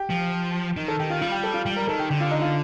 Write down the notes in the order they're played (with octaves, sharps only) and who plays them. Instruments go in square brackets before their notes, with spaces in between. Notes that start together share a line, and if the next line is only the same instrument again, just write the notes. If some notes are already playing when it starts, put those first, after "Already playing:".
Already playing: [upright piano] G4
[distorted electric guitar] F3
D#3
[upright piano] A4
[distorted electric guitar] D#3 [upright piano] G4
[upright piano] F4
[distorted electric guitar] G3 [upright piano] F4
[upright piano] G4
A4
F4
[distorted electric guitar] G3 [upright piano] G4
[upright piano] A#4
[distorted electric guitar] D#3 [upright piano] A4
[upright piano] G4
[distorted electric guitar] D3 [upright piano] G4
[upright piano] F4
D#4
F4